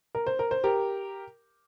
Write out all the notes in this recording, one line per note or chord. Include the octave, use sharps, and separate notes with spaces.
A#4
C5
A#4
C5
G4 A#4